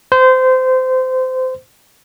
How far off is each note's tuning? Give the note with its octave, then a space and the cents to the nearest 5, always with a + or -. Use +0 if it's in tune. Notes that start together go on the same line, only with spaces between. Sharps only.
C5 -25